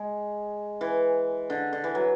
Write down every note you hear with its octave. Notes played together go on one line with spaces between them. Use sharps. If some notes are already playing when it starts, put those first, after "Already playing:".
Already playing: G#3
E3
D3
D3
E3
F#3